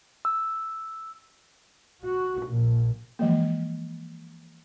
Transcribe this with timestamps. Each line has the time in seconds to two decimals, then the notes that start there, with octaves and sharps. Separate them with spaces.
0.25 E6
2.04 F#4
2.45 A#1
3.19 E3 F3 G#3 A#3